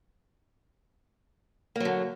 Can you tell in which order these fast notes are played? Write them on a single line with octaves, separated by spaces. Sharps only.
A#3 F#3 D3